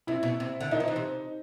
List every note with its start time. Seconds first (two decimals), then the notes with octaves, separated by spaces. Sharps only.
0.07 C3 E4
0.23 B2
0.40 C3
0.61 D3
0.71 D#3 D#4
0.80 F3
0.88 E3
0.96 C3